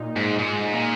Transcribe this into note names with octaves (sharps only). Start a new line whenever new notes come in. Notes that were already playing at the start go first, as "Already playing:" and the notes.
Already playing: A#2 D#4
G#2 G#3
G#2 G#3
G#3
A#2